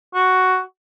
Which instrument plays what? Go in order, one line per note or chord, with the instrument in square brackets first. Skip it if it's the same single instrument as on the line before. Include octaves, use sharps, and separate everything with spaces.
[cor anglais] F#4